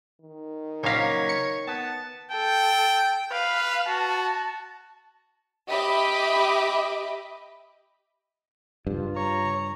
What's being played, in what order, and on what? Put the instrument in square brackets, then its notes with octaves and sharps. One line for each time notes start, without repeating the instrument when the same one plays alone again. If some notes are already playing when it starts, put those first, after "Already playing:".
[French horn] D#3
[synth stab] A#1 F5 [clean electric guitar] C#3 F#3 A#3 [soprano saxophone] C#5
[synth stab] C#7
[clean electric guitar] B3 [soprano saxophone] A5
[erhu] A4 [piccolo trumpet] G5
[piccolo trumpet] B4 [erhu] F5
[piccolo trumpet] F#4 [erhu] A5
[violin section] G4 D#5 E5 B5 D6
[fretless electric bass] G2 [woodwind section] C#3 F4
[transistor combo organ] C#5 [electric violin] A#5